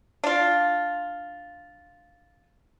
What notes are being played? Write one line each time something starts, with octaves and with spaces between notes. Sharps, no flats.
D4 F4